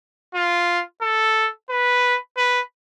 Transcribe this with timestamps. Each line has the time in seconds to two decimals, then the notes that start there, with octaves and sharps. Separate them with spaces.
0.35 F4
1.02 A4
1.70 B4
2.37 B4